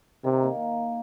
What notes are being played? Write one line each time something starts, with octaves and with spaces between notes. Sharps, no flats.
C3 D#3
A#3